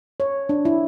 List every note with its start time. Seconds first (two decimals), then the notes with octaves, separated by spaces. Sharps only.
0.20 C#5
0.49 D4
0.65 E4